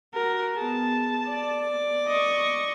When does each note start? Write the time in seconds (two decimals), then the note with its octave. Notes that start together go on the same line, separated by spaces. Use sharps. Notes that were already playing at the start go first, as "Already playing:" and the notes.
0.14 F#4 A#4
0.58 B3 G#4 A5
1.27 D5 D6
2.08 D#5 C#6